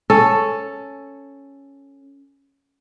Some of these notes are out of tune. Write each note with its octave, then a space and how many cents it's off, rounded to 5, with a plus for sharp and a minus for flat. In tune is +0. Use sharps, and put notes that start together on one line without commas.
C#4 +0 A4 +5